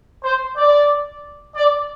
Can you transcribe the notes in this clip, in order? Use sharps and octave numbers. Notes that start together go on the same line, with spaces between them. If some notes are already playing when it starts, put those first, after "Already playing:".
C5
D5
D5